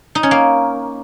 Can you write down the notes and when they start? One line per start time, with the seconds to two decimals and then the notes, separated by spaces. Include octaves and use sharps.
0.15 D#4
0.23 C#4
0.31 A#3